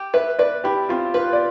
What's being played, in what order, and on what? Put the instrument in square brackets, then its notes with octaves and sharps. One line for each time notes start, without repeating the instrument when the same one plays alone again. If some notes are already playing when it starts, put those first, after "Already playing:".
Already playing: [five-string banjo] G4
[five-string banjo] B4 [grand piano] E5
[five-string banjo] B4 [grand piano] D5
[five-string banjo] E4 [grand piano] G4
[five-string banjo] C4 [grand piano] F4
[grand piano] F4 [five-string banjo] B4
[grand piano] D5